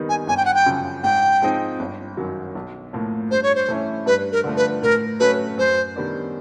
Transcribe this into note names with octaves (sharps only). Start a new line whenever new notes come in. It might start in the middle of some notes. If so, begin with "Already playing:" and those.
Already playing: D#2 D#3 G3 B3 D#4
G#5
G1 G#5
G5
F#5
G5
F#2 C#3 F3
G#2 G5
F3 G#3 C4 D#4
G1
F#2 D#3 F#3
B1
A2 F3 A#3
G2 C5
C#5
C5
E3 A3 C#4 E4
G2 B4
A#4
D3 F3 A3
B4
A2 A#4
F#3 A3 C#4 B4
F#2 C5
D#3 G3 B3 D4